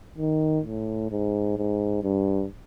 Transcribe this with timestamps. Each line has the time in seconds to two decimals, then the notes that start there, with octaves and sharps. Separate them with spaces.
0.18 D#3
0.65 A2
1.11 G#2
1.57 G#2
2.03 G2